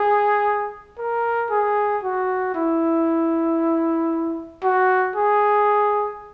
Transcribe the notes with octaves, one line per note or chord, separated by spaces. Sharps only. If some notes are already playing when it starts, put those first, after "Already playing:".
Already playing: G#4
A#4
G#4
F#4
E4
F#4
G#4